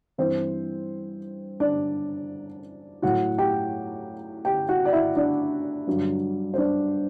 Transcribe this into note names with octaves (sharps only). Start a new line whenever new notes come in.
G2 E3 C4 C5
D4 D5
A2 F#3 F#4 F#5
G4 G5
G4 G5
F#4 F#5
D5
E4 E5
D4 D5
G2 D3 F#3
C5
D4 D5